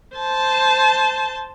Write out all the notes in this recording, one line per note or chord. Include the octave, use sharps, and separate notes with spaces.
C5 A5